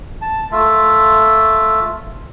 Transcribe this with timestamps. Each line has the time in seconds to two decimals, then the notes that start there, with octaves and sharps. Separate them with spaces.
0.22 A5
0.52 A3 F4 E5